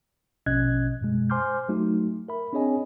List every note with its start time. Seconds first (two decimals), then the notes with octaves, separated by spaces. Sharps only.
0.46 A#1 B2 C#4 D#5 F#6 G#6
1.01 F#2 B2 G#3
1.30 C5 G#5 C6 D6 F6 G6
1.69 F#3 A3 D#4 F#4
2.28 A#4 E5 B5
2.53 C4 D4 G#4 C#5 D#5 G#5